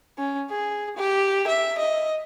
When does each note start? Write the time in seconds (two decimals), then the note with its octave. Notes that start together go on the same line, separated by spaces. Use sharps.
0.18 C#4
0.50 G#4
0.96 G4
1.47 E5
1.78 D#5